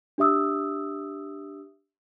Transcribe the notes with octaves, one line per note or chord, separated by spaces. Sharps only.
D4 G4 E5 D#6 E6